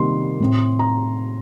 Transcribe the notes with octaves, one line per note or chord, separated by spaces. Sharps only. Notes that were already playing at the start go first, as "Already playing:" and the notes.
Already playing: C3 D#3 G3 A#3 C6
A2 A3 C4
A#5